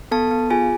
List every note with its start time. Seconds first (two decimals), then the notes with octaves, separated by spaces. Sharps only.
0.11 B3 A4 A5
0.31 B3
0.50 F4 G#4 G#5